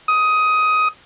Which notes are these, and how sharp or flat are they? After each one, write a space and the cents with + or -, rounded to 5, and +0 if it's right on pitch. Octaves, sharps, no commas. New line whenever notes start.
D#6 +15